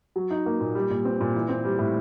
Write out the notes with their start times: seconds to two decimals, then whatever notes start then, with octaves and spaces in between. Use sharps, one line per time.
0.16 F#3
0.30 D#4
0.46 A#3
0.60 A#2
0.75 G3
0.90 A#2
1.05 C4
1.20 A#2
1.35 E3
1.49 C4
1.65 G3
1.79 A2